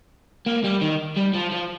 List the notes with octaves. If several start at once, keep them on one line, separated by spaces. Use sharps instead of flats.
A#3
G3
D#3
G3
F3
F3